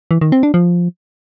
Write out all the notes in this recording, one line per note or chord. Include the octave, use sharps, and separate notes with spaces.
E3
D#3
C4
D4
F3